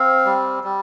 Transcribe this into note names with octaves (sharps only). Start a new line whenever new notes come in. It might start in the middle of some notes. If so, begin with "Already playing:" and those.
Already playing: C4 F5
G3
G3